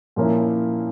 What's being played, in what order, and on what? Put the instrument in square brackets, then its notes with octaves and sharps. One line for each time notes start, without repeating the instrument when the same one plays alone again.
[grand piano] A#2 F3 A#3 C#4 E4